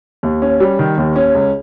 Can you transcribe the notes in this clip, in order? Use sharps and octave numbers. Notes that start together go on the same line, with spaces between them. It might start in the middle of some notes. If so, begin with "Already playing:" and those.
D#2
C#4
G3
D#3
D#2
C#4
C#2